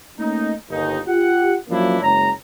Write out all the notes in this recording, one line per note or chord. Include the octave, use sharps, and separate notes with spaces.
A3 A#3 C#4 D#4
G1 D#2 D#4
F4 G4 F#5
F3 F#3 A#3 C#4 D4 E4
F#1 G#3 C#5 A#5